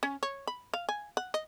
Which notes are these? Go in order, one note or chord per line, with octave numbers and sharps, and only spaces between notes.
C#4
C#5
B5
F5
G#5
F#5
D#5